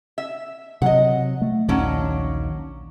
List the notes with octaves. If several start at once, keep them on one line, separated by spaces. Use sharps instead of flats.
E5
C3 F#3 D#5 F#5
A3
A#1 D#2 D#3 F#3 C#4 D4